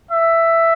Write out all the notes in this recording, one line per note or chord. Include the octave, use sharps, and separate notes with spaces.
E5